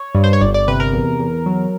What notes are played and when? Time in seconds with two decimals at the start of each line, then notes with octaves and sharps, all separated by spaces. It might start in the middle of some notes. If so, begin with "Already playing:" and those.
Already playing: C#5
0.15 G2
0.24 C5
0.33 C#5
0.41 G1 D5
0.54 D5
0.68 C3 B4
0.80 A#4
0.93 E2
1.19 E2
1.46 F#3